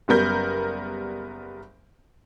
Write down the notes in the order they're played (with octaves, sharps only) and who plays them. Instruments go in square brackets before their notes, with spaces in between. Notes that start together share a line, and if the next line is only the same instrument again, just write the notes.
[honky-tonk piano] F#1 G3 B3 A#4 G6